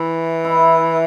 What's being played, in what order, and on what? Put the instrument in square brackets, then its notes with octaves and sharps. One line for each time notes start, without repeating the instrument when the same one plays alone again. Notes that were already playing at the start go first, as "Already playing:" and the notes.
Already playing: [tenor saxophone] E3 [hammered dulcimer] E4
[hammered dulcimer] E4